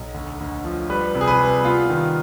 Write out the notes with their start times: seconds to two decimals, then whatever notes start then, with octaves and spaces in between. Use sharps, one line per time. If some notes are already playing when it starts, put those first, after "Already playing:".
Already playing: B1
0.14 D2
0.40 D2
0.65 F3
0.90 G3 B4
1.15 C3
1.21 G#4
1.28 B4
1.40 G3
1.65 B3 F4
1.90 D#3